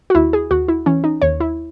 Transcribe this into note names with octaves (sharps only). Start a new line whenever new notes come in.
F#4
D#2 E4
G#4
D#2 F#4
E4
E3 C#4
D#4
D#2 C#5
E4